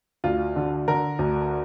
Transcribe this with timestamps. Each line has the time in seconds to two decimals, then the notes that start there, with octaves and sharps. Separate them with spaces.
0.24 D2 F4
0.56 D3
0.88 D3 A#4
1.19 D2